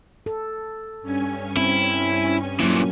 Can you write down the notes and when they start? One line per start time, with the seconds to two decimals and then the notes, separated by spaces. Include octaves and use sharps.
0.26 A4
1.02 G2 C#4 G#5
1.57 C4 E4
2.60 A#2 E3 F#3 A#3